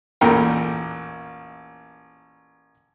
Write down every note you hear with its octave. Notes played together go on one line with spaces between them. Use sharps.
A1 E2 A#2 A3 A#4 G5